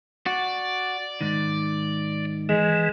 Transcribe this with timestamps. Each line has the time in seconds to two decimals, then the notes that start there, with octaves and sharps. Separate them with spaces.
0.26 F#4 D5
1.21 G#2 D#3
2.49 E3 G#3